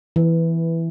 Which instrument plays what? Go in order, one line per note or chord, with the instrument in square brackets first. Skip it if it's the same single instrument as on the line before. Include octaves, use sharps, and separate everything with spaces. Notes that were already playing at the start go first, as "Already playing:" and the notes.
[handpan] E3